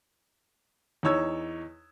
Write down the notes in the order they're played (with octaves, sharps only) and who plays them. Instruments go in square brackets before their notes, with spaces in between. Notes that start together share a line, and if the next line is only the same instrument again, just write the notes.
[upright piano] E2 D#4 C#5 E6 G#6